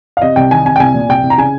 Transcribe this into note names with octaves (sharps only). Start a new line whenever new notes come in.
F5
C3 D#5
C2 G5
D#3 G#5
C3 G#5
G5
C2 G#5
A#2
C2 G5
C2
A#5
C#3 G#5